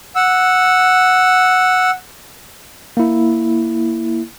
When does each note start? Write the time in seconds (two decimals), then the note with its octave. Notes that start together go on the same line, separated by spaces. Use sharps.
0.16 F#5 E6
2.97 A#3 E4